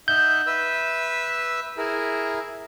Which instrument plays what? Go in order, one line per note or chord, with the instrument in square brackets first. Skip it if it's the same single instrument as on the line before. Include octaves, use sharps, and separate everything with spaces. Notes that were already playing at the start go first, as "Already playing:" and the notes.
[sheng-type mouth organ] D#4 E5 F#5 [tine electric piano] G6
[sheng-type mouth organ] B4 E5 E6
E4 G#4 A#4